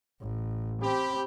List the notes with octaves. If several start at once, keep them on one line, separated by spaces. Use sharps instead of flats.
A1
C4 G4 B5